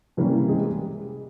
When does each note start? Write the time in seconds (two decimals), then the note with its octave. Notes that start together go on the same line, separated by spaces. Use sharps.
0.17 C3 E3 G3 A#3 C#4
0.49 G#3 G#4